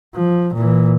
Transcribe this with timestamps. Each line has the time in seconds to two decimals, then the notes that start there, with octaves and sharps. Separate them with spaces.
0.15 F3
0.54 A#2 E3